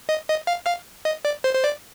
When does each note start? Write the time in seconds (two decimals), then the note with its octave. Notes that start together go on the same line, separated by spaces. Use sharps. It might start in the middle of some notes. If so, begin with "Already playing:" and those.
0.09 D#5
0.29 D#5
0.47 F5
0.66 F5
1.05 D#5
1.25 D5
1.44 C5
1.55 C5
1.64 D5